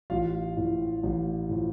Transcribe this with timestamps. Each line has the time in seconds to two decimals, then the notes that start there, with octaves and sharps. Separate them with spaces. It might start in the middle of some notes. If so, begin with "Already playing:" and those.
0.10 A1 F4 F5
0.57 A2 F3
1.03 A1
1.49 A2 F3